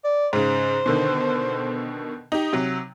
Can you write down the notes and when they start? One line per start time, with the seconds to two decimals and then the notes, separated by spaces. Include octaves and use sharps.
0.05 D5
0.33 G#2 C#3 C5
0.86 B2 D3 D#3
2.32 D#4 G4
2.53 C3 F#3